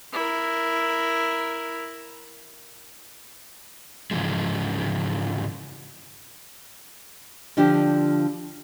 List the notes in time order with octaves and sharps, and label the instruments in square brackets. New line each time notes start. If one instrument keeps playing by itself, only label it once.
[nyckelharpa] E4 A#4
[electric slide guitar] G#2 C#3 E3 F3 G#3
[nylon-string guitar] D3 F3 D4 F4 G4